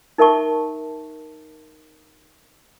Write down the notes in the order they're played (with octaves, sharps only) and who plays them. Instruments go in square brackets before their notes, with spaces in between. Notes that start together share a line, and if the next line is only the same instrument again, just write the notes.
[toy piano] D#4 A#4 E5 A5 C#6